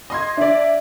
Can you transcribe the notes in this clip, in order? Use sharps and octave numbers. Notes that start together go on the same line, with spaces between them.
D#5 C6 G#6
D4 D5 E5